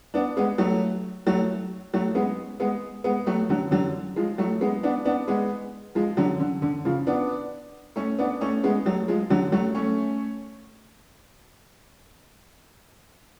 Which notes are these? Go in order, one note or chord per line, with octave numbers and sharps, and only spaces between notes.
B3 D4
G#3 B3
F#3 A3
F#3 A3
F#3 A3
G#3 B3
G#3 B3
G#3 B3
F#3 A3
D3 F#3
D3 F#3
F3 G#3
F#3 A3
G#3 B3
B3 D4
B3 D4
G#3 B3
F3 G#3
D3 F#3
D3
D3
C#3 F3
B3 D4
A3 C#4
B3 D4
A3 C#4
G#3 B3
F#3 A3
F3 G#3
D3 F#3
F#3 A3
A3 C#4